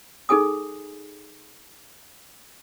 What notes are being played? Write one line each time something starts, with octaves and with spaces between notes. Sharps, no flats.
D#4 G#4 A4 G#5 D#6